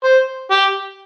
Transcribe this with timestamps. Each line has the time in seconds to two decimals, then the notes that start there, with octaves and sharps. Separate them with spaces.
0.04 C5
0.51 G4